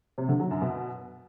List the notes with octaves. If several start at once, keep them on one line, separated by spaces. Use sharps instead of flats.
C3
D3
F#3
F#2
B2